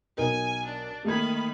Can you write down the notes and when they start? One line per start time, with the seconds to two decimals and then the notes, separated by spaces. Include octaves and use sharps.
0.17 B1 A#4 D#5 G#5
0.65 D4
1.05 D#3 A3 A#3 B5 G#6